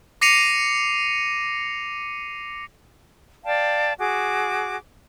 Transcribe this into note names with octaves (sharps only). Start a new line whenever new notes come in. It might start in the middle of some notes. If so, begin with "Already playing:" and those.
D6 A#6 C7 C#7 D#7 F7
D5 F5 G5 A5
F#4 G#4 D6